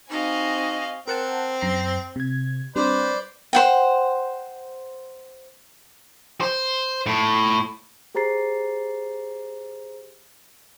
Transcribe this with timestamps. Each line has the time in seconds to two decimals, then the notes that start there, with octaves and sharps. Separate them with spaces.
0.10 C4 D#4 F#4 D#5 F5 G#5
1.08 C4 A#4 F#5 A5
1.61 F#2 A#5 C7
2.16 C3 G#6
2.76 G3 C4 D4 B4 C5 D5
3.53 C5 F#5 G5
6.41 C5
7.06 A2
8.15 G4 G#4 C5 A#5 A6 C7